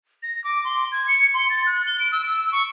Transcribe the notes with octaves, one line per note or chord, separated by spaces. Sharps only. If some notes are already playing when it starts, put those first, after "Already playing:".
A#6
D6
C6
G#6
C#7
C6
A6
F#6
G7
D7
E6
C#6